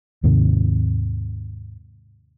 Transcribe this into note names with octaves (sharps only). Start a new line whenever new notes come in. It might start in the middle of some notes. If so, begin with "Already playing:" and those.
D#2 G#2 C3 D#3